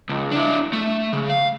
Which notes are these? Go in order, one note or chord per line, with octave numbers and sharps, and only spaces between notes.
C#2
D4 E4
A3
C#3
F5